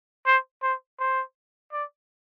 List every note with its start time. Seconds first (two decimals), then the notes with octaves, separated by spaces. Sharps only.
0.26 C5
0.63 C5
1.00 C5
1.72 D5